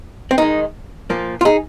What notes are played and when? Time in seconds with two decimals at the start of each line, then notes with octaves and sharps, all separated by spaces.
0.31 C4
0.38 D#3 G#3 D#4
1.10 A#2 F3 A#3
1.41 F4
1.45 D#4 G#4